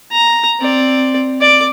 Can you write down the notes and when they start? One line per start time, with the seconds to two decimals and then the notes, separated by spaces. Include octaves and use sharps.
0.12 A#5
0.60 C4 D5
1.41 D5 D6